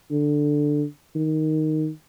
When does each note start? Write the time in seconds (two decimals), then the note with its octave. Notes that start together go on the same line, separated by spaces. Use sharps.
0.11 D3
1.15 D#3